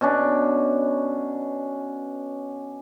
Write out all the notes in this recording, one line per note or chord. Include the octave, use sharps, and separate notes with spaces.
B2 C#4 D4